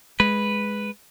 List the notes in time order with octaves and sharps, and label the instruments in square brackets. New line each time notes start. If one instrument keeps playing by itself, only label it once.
[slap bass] G#3 [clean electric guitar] B4